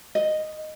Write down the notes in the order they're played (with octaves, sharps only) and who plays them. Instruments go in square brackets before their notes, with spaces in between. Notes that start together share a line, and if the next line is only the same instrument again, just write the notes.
[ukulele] D#5